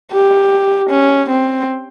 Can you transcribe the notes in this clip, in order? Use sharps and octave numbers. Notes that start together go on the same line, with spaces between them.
G4
C#4
C4